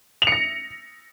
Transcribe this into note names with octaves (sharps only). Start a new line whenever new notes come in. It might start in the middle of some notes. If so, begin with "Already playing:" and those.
F7
C#7
A#6